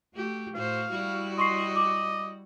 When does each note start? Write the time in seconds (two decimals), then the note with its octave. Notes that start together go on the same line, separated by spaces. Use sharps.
0.14 A3 F#4 G4
0.55 A2 F#4 C5 F5
0.91 G3 E4 F#4
1.38 D#5 C6 C#6 C7
1.76 D6